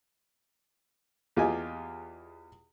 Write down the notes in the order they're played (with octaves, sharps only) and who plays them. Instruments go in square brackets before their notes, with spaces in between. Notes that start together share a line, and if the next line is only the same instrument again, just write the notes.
[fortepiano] E2 F4 G4 G#4 D#5 G#5